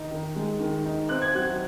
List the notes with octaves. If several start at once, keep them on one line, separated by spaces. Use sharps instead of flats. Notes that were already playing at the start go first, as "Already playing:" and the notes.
Already playing: D#3 D#4
D#3
G#3
D#3
D#4
C4 F#6
G#6
F#3 F#6